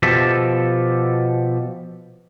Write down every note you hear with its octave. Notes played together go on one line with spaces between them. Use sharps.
B2 F3 G4 A4 E5